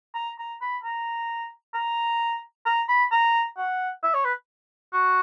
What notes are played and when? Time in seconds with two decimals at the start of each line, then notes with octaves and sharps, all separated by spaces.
0.15 A#5
0.39 A#5
0.61 B5
0.84 A#5
1.75 A#5
2.66 A#5
2.89 B5
3.12 A#5
3.58 F#5
4.03 E5
4.14 C#5
4.25 B4
4.93 F#4